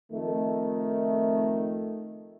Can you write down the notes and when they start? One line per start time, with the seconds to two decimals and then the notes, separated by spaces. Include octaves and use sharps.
0.12 F2 D#3 A3